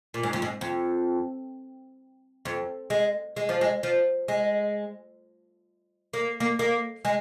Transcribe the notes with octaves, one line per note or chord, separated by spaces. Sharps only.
A#2
G#2
F2
G#2
F2
F2
G#3
G#3
F3
G#3
F3
G#3
A#3
A#3
A#3
G#3